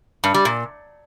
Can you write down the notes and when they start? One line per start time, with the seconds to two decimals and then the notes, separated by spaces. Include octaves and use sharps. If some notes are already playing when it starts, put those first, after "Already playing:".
0.24 G2
0.34 G3
0.45 A#2